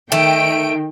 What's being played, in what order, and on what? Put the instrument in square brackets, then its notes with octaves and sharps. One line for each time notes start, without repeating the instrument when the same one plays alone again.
[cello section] D#3 [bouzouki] A3 [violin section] G5 D7